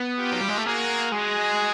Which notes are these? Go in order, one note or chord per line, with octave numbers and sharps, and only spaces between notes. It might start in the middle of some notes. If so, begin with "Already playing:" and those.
Already playing: B3
F4 G4
F#3
G3
G#3
A3
A#3 F#4 G#4
G#3 F#4 G#4